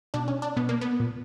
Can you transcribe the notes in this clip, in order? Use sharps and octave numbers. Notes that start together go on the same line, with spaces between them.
B2 D4
C#4
D4
B2 B3
A#3
B3
A#2